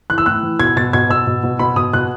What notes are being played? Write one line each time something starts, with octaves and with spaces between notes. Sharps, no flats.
E3 F#6
E6
A2 F#6
E3
B2 G#6
B2 A6
B2 G#6
B2 E6
B2
B2
B2 B5
B2 D#6
B2 F#6